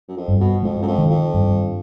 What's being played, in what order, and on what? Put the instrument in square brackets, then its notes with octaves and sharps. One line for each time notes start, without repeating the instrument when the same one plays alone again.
[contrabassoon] F#2
F2
[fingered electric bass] G2
[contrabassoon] B2
[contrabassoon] F2 [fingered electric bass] G#3
[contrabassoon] F#2
F2
[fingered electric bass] D#3
[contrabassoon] F2
[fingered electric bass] G2